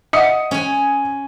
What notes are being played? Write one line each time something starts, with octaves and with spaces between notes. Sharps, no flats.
D#5 E5 F#5 D#6 C#7
C#4 G#5